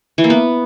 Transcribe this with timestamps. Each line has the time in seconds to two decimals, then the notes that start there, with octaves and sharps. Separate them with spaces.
0.18 E3
0.24 A#3
0.30 B3